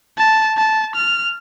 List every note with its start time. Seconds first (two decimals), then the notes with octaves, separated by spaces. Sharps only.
0.18 A5
0.57 A5
0.96 F6